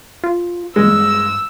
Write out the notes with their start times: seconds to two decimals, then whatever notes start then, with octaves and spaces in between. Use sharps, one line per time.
0.24 F4
0.76 G2 G#3 E6